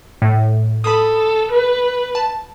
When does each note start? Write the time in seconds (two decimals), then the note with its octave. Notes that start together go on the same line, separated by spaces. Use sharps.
0.22 A2
0.84 A4 B5 D#6
1.51 B4
2.15 A5